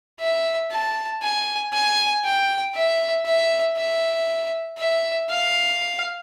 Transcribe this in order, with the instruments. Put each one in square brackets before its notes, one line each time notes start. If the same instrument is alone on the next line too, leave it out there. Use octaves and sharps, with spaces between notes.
[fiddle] E5
A5
G#5
G#5
G5
E5
E5
E5
E5
F5